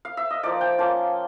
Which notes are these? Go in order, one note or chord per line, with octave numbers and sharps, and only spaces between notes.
F5
E5
D#5
F3 A#3 D#4 D5
G5
A#3 C#4 F4 A5